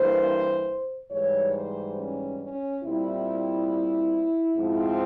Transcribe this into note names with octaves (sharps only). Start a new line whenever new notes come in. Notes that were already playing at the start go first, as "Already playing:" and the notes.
Already playing: G2 E3 A#3 C5
G#2 E3 G3 C#5
C5
C#4
C#4
A#2 G3 C4 E4
G#2 F3 C4